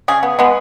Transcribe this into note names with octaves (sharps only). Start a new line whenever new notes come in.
C#3 G#4
B3
G#3 B3